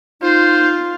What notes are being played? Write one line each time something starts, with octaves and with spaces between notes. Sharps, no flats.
D#4 F4 C5